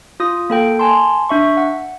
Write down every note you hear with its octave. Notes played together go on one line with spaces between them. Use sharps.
F4 D#6
A#3 A4 G5
G#5 A5 C6
D4 E5 C#6
F#5